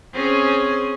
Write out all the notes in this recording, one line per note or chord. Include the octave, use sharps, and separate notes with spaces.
C4 C#4 G#4